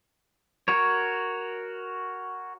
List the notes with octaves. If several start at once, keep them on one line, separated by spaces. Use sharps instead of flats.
F#4 A#4 C#5